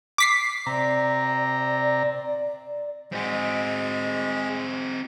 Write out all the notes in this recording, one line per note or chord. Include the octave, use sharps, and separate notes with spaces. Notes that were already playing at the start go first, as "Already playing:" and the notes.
D6 B6 C7
C3 D5 A#5
G#3 C4 F#4